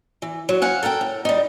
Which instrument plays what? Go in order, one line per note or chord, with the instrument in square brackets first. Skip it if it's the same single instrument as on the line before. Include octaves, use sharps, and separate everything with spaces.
[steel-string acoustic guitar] E3
F#3
F5 F#5 G#5
A4 A#4 F#5 G5
A2
G3 D#4